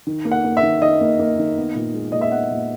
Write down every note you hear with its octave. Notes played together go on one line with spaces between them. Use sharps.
D#3
A#3
F#5
A#3
E5
D#3
D#3 D#5
A#3
A#3
D#3
B3
A#2
G#3
A#2 D#5
E5
B3 F#5
A#2